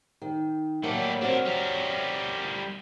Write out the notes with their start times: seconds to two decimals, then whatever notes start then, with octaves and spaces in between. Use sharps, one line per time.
0.22 D#3
0.83 A2 F#3 G3 A#3 A4
1.21 C4 D4 F#4 A#4 C#5
1.45 G3 A#4